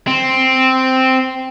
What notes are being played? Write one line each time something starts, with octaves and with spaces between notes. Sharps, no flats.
C4